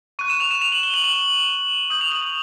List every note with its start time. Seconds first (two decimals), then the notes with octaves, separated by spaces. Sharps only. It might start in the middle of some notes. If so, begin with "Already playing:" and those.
0.19 C#6 F#6 D#7
0.30 E7
0.40 F7
0.51 E7
0.61 F7
0.72 F#7
0.83 G7
0.94 F#7
1.04 F#7
1.90 D#6 G6 F#7
2.01 F7
2.12 F#7
2.23 F#7